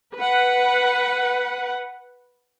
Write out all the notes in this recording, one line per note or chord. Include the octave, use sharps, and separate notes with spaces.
B4 F#5